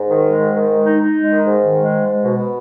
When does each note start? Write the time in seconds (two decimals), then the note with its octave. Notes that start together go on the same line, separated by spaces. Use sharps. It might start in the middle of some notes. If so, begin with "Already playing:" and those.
Already playing: G#2
0.09 D#3
0.25 G#3
0.39 G#2
0.55 D#3
0.70 G#3
0.86 D#4
1.01 D#4
1.16 G#3
1.32 D#3
1.46 G#2
1.61 D#3
1.78 G#3
1.92 G#2
2.08 G#3
2.23 B2
2.38 B2